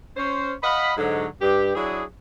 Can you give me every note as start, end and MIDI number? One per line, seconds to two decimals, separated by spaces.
0.16 0.53 61
0.16 0.53 72
0.62 0.93 75
0.62 0.93 77
0.62 0.93 78
0.62 0.93 83
0.97 1.26 44
0.97 1.26 50
0.97 1.26 54
1.40 1.71 43
1.40 1.71 67
1.75 2.03 54
1.75 2.03 62
1.75 2.03 64
1.75 2.03 68